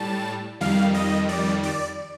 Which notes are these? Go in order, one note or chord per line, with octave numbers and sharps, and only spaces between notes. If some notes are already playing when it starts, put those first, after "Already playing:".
Already playing: A2 G3 A5
F2 D#3 G3 F5
D#5
D5
D5